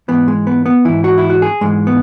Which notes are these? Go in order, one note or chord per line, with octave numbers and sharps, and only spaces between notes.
G#2 E3 B3
G#3
B3
B3
G#2 E3 E4
F#4
E4
F#4
G#4
G#2 E3 G#3
B3